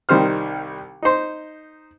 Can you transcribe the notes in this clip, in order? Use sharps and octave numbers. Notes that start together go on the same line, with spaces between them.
C2 D#3 G3 C5 F6
D#4 C5